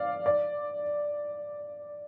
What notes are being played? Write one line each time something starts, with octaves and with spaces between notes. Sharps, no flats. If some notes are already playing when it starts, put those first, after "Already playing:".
Already playing: D5 F5
D5